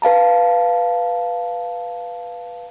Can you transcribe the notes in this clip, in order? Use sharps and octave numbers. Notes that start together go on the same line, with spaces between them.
B4 F5 A5 A#5